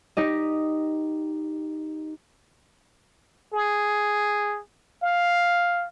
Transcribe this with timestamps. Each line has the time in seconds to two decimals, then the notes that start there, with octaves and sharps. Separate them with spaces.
0.17 D#4 G4 D#5
3.54 G#4
5.03 F5